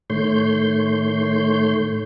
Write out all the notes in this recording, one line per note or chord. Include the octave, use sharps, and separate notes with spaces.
A2 D#3 A3 C#5 C6 G6